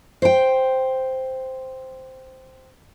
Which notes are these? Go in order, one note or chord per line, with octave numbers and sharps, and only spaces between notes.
C5 G5